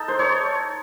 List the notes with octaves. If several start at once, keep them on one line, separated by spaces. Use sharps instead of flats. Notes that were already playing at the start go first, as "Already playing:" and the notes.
Already playing: D#4 A4
C5
C#5